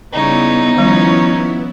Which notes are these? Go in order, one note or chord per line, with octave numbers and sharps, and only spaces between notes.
C#3 G3 B3 D#4 E4 C#5
D#3 F3 G3 C#4 C#5